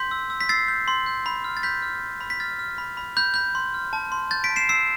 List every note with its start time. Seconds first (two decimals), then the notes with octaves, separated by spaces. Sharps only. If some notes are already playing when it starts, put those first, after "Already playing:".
Already playing: C6 G6 B6
0.11 E6
0.30 E6
0.41 B6
0.49 E6 A6 C7
0.68 G6
0.88 C6
1.06 G6
1.26 B5
1.44 F6
1.57 A6
1.63 B5 G6 B6
1.82 F6
2.02 F6
2.21 B5
2.30 B6
2.40 F6 A6
2.59 F6
2.78 B5
2.97 B5
3.17 B5 G6
3.34 B5 G6
3.55 C6
3.74 F6
3.93 A5
4.12 C6
4.31 G6 A6
4.44 B6 D7
4.50 A5
4.56 C7 E7
4.69 E6 C7 E7